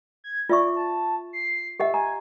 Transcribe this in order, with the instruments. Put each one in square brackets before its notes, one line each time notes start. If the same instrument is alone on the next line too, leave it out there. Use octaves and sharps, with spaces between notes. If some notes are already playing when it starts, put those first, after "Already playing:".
[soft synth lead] G#6
[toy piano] F4 E5 C#6 [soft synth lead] D5
[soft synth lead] A5
C7
[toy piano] G4 D#5 F#5 [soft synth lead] E5
[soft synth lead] G#5 [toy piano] A#5